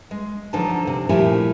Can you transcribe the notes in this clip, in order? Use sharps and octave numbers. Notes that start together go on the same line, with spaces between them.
G#3
D3 F3 F#3 D#4 G#5 A5
C3
A#2 F3 A3 E4 G4 G#5